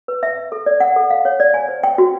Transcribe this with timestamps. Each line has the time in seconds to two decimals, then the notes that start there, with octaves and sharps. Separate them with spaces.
0.08 B4
0.23 E5
0.38 E5
0.52 A4
0.66 D5
0.80 F#5
0.96 A4
1.10 F5
1.25 C#5
1.40 D5
1.54 G#5
1.68 C5
1.83 G5
1.98 F#4